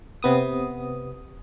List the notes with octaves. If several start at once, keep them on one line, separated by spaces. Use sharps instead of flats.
C3 B3 D#6